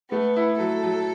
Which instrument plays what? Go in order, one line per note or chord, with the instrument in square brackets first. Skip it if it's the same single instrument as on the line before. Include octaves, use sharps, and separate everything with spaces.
[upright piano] A3 [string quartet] B3
[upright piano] E4
[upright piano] F#3 [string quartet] A4
[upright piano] F#3